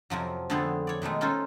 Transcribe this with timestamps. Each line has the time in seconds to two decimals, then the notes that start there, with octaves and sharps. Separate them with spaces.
0.10 F2 C3 F3 F#3
0.50 D3 A3 B3 C4 G#4 A4
0.87 C#5 D5
1.02 B2 D#3 G#3 A3
1.21 C#4 D#4 F4 A4 C5